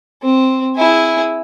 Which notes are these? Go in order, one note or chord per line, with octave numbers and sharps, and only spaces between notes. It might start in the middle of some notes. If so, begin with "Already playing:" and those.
C4
E4 G#4